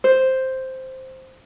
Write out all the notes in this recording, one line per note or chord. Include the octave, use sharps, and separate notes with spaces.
C5